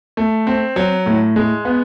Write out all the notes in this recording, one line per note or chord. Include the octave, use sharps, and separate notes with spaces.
A3
C4
F#3
A2
G#3
B3